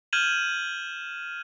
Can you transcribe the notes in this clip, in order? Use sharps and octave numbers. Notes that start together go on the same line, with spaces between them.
F6 G6 G#6 D#7 E7 F#7